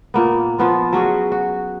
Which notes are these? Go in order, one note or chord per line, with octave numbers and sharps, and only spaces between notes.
A#2 A#3 B3
F3 B3 F4
F#3 C#4 F#4 G#4
F#4